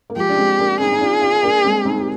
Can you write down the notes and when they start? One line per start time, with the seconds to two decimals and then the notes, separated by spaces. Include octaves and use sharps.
0.10 A#3
0.16 F3 G#3 G4
0.29 D4
0.37 G#3 C4
0.59 A#3 D4
0.80 C4 D#4 G#4
0.92 D#4
1.01 D4 F4
1.22 D4 F4
1.43 A#3 D4
1.64 G#3 C4
1.85 C4 D#4
2.00 G4